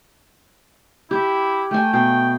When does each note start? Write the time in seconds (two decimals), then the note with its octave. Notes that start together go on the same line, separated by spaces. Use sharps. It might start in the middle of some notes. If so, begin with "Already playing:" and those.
1.11 E4 G4
1.71 A3 G5 G#5
1.93 B2 G5